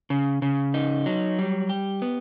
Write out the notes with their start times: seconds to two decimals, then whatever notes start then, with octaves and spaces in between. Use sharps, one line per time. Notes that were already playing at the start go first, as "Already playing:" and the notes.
0.10 C#3
0.42 C#3
0.74 D#4
1.06 F#3
1.39 G3
1.69 G4
2.02 B3